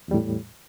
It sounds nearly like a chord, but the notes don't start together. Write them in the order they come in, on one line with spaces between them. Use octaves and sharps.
E2 G3 A2